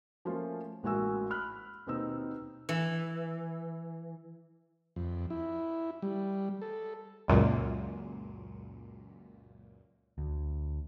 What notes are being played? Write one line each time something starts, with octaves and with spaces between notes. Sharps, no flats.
F3 A3 A#3 C#4 F4
A1 G#2 A#3 F#4 G#5 E6
B5 F6 F#6
D#2 B2 B3 C4 D#4 E6
E3
F2
E4
G3
A4
C#2 F#2 A#2
D2